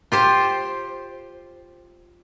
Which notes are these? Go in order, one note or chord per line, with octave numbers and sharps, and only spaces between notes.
F4 G4 C5